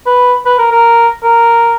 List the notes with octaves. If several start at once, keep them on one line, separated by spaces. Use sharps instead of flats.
B4
B4
A#4
A#4
A#4